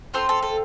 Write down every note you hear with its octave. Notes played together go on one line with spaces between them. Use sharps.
C4 F4 A4 C5
A4
A4